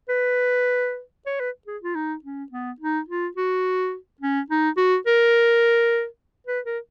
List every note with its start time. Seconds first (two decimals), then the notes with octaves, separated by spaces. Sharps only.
0.09 B4
1.26 C#5
1.40 B4
1.67 G#4
1.82 F4
1.95 D#4
2.24 C#4
2.52 B3
2.80 D#4
3.08 F4
3.37 F#4
4.21 C#4
4.50 D#4
4.77 F#4
5.07 A#4
6.47 B4
6.65 A#4